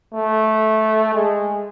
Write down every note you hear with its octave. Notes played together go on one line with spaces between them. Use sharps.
A3
G#3